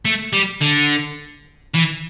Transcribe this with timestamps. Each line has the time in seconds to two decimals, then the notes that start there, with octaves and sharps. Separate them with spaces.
0.05 A3
0.33 G3
0.62 D3
1.74 E3